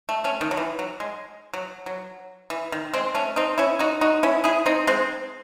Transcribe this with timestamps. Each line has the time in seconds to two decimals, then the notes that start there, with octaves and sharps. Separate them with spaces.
0.09 A3
0.24 A3 C#4
0.41 D#3
0.51 F#3
0.57 E3
0.79 F#3
1.00 G#3
1.53 F#3
1.86 F#3
2.50 E3
2.72 D#3
2.94 G#3 C4
3.15 A3 C#4
3.36 C4 D#4
3.58 C#4 E4
3.79 D#4 F#4
4.01 D#4 F#4
4.23 C#4 E4
4.44 E4 G#4
4.66 C4 D#4
4.87 G#3 C4